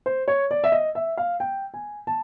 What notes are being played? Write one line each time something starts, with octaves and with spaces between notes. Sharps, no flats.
C5
C#5
D5
E5
D#5
E5
F5
G5
G#5
A5